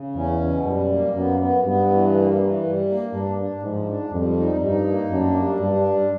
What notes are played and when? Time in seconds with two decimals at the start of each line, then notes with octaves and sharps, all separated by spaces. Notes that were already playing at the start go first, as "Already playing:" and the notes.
Already playing: C#3
0.15 E2 C#4
0.41 B2
0.65 F#2 G3
0.90 A#3
1.15 F#2 B3
1.39 B3
1.64 G2 B3
1.89 E3
2.14 A#3
2.38 E3
2.63 G3
2.88 A#3
3.13 G2 D4
3.37 D4
3.63 G#2 F3
3.87 D4
4.12 F2 G3
4.36 D#4
4.61 G2 D#4
4.86 A#3
5.10 F#2 D4
5.36 G3
5.61 G2 D4
5.85 G3